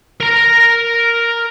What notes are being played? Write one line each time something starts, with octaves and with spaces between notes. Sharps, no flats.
A#4 A#5